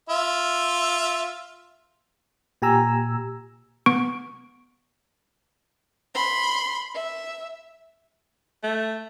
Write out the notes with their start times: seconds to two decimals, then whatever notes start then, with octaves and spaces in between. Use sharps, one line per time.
0.09 F4 E5
2.62 A#2 G4 G#5 A#5 E6
3.86 B3 C#6 D7
6.15 B5 C6
6.95 E5
8.63 A3